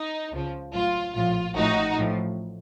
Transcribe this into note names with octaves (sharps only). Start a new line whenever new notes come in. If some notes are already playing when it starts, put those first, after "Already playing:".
Already playing: D#4
C#2 C#3 F3
A1 A2 F#3 F4
A#1 A2 F3 F4
A1 A2 F3 D#4 F#4
A1 A2 F3